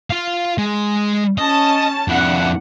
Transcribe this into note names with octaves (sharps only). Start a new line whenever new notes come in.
F4 F5
G#3
C#4 D#5 A5
F2 D4 E4 F#5